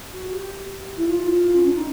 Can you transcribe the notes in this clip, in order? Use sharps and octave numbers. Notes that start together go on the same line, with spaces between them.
F#4
G4
E4
F4
C#4
D4
D#4